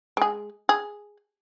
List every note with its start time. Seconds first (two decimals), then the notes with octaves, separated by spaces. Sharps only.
0.17 G#3 G#4
0.69 G#4